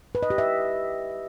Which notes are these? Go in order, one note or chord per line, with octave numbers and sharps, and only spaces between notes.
B4
D#5
G4
E5